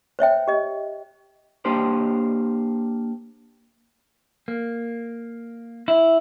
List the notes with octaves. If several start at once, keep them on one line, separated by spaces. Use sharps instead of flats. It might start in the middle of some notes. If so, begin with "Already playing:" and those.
C5 C#5 E5 G5
G4 D#5
A#3 D4 G4 A#4 C5
A#3
E4